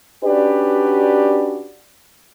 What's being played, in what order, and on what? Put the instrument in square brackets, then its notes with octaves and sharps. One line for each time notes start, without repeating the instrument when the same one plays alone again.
[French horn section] C#4 D4 F#4 G4 B4 D5